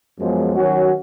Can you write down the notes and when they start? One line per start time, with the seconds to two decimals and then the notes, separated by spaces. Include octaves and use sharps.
0.17 F#2 F3 G#3 B3
0.55 D#3 F#3 C#4 F#4